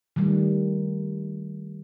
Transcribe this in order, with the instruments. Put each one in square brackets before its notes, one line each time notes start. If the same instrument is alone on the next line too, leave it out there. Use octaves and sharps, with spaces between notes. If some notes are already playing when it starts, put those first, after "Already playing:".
[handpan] D#3 G3 A3